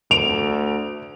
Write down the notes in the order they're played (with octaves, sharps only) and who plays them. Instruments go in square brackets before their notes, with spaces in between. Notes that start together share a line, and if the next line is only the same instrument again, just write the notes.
[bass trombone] D2 [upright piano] D7 F7